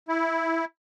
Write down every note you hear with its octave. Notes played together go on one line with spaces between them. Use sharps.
E4